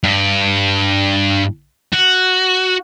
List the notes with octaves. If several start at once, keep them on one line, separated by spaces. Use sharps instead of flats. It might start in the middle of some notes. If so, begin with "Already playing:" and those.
G2
F#4